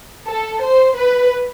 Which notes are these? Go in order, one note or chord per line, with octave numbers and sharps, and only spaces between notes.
A4
C5
B4